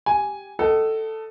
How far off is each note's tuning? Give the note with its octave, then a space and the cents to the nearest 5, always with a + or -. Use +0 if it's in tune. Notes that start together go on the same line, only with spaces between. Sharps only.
G4 +0 G#5 +0
A4 +5 D#5 +0 F#5 +45